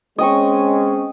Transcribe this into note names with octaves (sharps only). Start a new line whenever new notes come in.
G#3 C4 C#4 D#5 G5 C#6